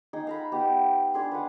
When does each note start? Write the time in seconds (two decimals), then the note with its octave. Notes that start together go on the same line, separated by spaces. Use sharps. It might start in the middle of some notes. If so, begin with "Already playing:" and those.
0.13 D#4 G#4
0.27 F5 A#5 B5
0.52 B3 D#4 G4 F5
1.14 D4 G#4 C6
1.32 B4 F5 F#5